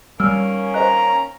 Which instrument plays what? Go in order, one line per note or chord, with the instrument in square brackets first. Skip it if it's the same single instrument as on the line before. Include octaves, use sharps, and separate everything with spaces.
[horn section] D#3 A#3 C#4 [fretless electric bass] G3 [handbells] E6 F6
[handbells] C5 D#5 F#6 [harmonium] A#5